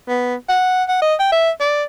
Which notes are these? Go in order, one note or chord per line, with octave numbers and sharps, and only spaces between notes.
B3
F#5
F#5
D#5
G5
E5
D5